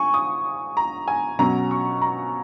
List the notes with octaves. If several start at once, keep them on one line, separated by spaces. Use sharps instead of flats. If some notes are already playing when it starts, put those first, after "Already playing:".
Already playing: G#5 C#6
D#6
A#5
G#5
B2 F#3 C#4 A#5
C#6
A#5